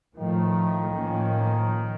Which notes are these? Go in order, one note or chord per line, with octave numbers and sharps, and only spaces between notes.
A2 D#3 F3 A3
A2 F3 A#3 C#4